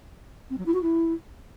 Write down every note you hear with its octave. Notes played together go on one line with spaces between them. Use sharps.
C4
F#3
E4
F#4
E4